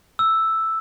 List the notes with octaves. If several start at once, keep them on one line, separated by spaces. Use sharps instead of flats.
E6